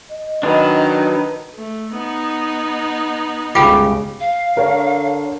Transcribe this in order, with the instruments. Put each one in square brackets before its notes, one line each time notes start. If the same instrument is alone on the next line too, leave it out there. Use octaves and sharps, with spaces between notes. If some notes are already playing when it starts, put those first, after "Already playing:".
[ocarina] D#5
[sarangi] D#3 [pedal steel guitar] F#3 D4 [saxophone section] B4
[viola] A3
B3 D#4
[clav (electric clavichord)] G1 G4 [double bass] C#2 C#3 [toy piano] F4 G5 D6
[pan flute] F5
[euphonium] D3 [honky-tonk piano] A#4 C#5